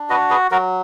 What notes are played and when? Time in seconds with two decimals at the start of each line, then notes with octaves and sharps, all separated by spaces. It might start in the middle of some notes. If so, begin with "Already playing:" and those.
Already playing: D4
0.10 F#4 B4 D#5
0.30 G#4 B4
0.51 F#3 F#4 A#4